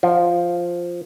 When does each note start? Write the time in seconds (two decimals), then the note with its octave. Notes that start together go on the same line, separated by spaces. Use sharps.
0.03 F3